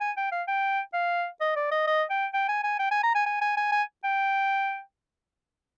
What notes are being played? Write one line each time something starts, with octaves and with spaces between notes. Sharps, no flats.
G#5
G5
F5
G5
F5
D#5
D5
D#5
D#5
G5
G5
G#5
G#5
G5
G#5
A#5
G#5
G#5
G#5
G#5
G#5
G5